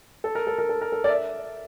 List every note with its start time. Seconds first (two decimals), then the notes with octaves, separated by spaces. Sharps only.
0.24 A4
0.35 A#4
0.47 A4
0.58 A#4
0.69 A4
0.82 A#4
0.92 A4
1.04 D5
1.09 E5